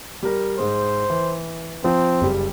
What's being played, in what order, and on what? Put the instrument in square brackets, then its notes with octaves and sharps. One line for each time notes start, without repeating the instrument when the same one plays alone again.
[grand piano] G3 A#4
[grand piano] G#2 G#3 [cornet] C5
[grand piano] E3
[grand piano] F3 [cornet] C4
[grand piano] F#1 G3